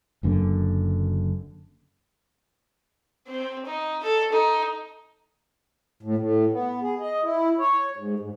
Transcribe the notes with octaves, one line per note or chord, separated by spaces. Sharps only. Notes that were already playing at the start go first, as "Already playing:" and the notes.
F#1 F#2 D3 A#3
C4
D#4
A4
D#4
A2
A2
B3
G#4
D#5
E4
C#5
G#2
G#2